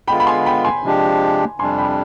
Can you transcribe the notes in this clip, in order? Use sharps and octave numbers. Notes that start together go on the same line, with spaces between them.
D3 G#3 B3 F4 G5 B5
B5
G#5 C6
G5 B5
G#5 C6
C3 F3 G#3 D4 G4
F2 C3 G3 D4 G#5 C6
G5 B5